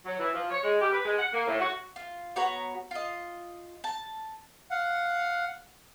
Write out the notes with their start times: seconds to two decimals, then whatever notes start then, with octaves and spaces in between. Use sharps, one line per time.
0.05 F#3
0.19 E3
0.33 F3
0.50 C#5
0.63 G#3
0.81 G4
0.92 B4
1.05 G#3
1.18 F#5
1.33 A#3
1.47 A2
1.60 F#4
1.96 F4
2.36 B3 F#4 C#5 A#5
2.91 F4 D#5
3.84 A5
4.71 F5 F#5